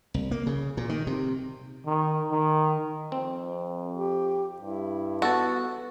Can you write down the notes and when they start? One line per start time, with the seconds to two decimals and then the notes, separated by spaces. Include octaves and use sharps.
0.14 C2
0.31 A#3
0.47 C#3
0.77 A#2
0.89 D#3
1.07 C3
1.86 D#3
2.31 D#3
3.12 F2 C4
3.95 G4
4.62 G2 E4
5.22 B3 F#4 A4 A5